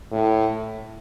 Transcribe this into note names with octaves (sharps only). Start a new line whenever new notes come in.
A2